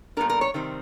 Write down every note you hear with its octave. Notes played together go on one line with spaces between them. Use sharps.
A#2 G3 B3 D4 A#4
A#4
C#5
C3 D#3 G3 C4